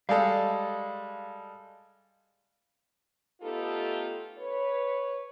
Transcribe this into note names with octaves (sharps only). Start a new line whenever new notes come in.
G3 G#3 A4 F5
A3 B3 D#4 F4 G4 A4
B4 C#5